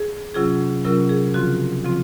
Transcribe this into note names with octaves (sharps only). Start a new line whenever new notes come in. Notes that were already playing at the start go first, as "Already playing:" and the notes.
Already playing: G#4
C3 F#3 C#4 F4 G#4
C3 F#3 C#4 F4 A#4
G#4
C#3 F3 C4 F4 F#4
C#3 F3 C4 F4